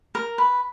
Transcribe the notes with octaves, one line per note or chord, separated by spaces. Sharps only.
A#4
B4